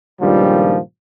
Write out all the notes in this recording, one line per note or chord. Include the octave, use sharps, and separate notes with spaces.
C#2 G2 A#2 D#3 F3 G3